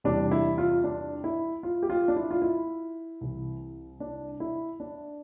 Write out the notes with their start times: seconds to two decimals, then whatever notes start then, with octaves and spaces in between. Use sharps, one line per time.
0.04 E2 C3 E3 G3 D4
0.31 E4
0.58 F4
0.84 D4
1.24 E4
1.63 F4
1.83 G4
1.90 F4
2.08 D4
2.16 E4
2.31 F4
2.42 E4
3.21 C2 C3 E3
4.00 D4
4.40 E4
4.80 D4